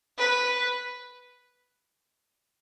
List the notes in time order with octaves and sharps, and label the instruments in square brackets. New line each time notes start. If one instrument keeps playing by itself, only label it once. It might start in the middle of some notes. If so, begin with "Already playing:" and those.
[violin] B4